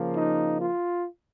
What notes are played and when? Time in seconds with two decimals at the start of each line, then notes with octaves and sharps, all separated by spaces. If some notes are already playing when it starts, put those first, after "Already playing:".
Already playing: C#3 F3 A#3
0.15 D#4
0.60 F4